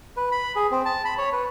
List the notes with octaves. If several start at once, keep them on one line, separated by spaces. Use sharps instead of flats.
B4
B5
G#4
C4
A5
B5
C#5
B4